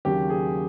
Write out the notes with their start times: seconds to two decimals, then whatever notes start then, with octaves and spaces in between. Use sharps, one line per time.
0.05 D#2 C#3 F#3 G4
0.30 G#4